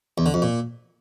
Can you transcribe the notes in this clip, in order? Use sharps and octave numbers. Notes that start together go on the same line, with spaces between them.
E2
D3
F2
A#2